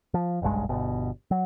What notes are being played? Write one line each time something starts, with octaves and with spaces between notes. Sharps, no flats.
F3
F#1 B1 G2 G#3
G1 B2
F#3